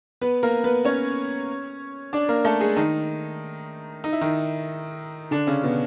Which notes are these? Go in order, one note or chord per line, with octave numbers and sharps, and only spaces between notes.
B3 B4
A#3 A#4
B3 B4
C#4 C#5
D4 D5
A#3 A#4
A3 A4
G#3 G#4
D#3 D#4
D#4
E4
D#3 D#4
D3 D4
C#3 C#4
B2 B3